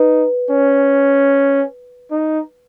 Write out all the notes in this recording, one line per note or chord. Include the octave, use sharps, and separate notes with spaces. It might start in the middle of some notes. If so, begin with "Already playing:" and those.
Already playing: D#4 B4
C#4
D#4